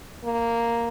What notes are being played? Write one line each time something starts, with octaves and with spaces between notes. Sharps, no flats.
A#3